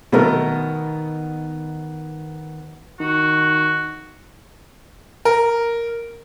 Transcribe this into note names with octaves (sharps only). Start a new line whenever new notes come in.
B2 D#3 A3 B3 A#4
D#3 F#4
A#4